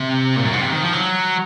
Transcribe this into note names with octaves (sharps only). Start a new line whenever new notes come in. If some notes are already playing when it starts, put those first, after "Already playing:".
Already playing: C3
A#2
F#2
G#2
C3
D#3
F3
F#3